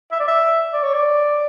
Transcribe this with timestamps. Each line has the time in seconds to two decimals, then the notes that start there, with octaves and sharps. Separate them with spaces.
0.12 E5
0.20 D5
0.28 E5
0.73 D5
0.83 C#5
0.94 D5